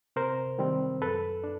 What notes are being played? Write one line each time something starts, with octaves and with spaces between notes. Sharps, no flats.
C3 A#4 C5
D#3 G3 C4
F#2 A4 B4
D4